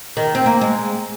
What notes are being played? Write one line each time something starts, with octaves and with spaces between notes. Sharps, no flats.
D#3
C4
A#3
G#3